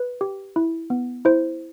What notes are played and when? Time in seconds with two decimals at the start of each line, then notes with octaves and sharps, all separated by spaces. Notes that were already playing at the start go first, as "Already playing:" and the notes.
Already playing: B4
0.21 G4
0.56 E4
0.90 B3
1.25 E4 C5